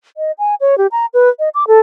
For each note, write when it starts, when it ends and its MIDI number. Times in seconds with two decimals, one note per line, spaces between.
0.17 0.32 75
0.39 0.55 80
0.61 0.78 73
0.78 0.87 67
0.92 1.06 82
1.14 1.29 71
1.39 1.49 75
1.55 1.67 86
1.67 1.80 69